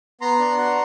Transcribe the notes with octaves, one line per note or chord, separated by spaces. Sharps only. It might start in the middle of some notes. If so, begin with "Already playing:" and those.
B3 A#5 C6
D4
F#4